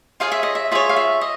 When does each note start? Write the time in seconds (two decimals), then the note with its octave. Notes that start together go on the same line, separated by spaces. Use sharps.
0.20 F4 G#4 C#5 F5
0.32 E5
0.43 D#5
0.55 E5
0.71 F4 G#4 C#5 E5
0.89 F5
0.96 E5
1.21 D#5